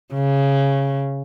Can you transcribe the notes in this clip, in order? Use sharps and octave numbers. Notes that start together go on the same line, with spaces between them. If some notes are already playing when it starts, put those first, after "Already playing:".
C#3